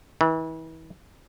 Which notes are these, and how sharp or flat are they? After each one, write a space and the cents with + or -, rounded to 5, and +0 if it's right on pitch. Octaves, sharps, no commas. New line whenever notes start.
E3 -35